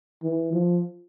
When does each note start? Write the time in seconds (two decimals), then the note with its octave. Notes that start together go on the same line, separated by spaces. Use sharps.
0.23 E3
0.53 F3